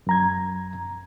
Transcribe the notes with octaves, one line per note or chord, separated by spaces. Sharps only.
F#2 A#5 G#6